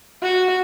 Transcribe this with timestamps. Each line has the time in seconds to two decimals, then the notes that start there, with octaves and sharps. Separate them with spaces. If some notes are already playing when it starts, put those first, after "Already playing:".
0.23 F#4